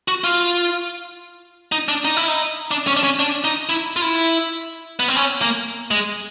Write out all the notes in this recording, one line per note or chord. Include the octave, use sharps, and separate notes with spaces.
F#4
F4
D#4
D4
D#4
E4
D#4
D4
C#4
D4
C#4
D4
D#4
E4
F4
E4
B3
C4
C#4
A#3
G#3